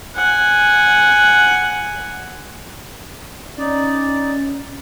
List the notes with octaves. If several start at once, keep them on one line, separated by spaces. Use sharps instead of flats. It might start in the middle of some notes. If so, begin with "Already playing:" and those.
F#5 G#5
C#4 D#4 D5